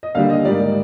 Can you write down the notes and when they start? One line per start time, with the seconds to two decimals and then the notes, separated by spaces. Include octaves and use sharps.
0.03 D#5
0.15 D#2 D3 G3 F5
0.30 D#5
0.45 G#2 G3 A#3 D5